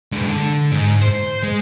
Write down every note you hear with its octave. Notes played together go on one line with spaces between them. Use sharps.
G#3 D4
D3
G#2
C5
G#3